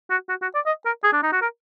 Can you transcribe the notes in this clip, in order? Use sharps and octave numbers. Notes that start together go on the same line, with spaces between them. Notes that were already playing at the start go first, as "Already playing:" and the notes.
F#4
F#4
F#4
D5
D#5
A#4
G#4
D4
D#4
F#4
A#4